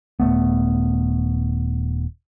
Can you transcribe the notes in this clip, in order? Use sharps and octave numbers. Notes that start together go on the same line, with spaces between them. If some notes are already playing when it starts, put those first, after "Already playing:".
D#1 G#1 A3 B3